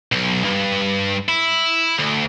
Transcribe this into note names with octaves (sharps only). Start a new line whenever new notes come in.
B1
G2
E4
D2